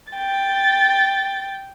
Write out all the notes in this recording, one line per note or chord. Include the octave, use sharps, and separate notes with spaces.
G5 A6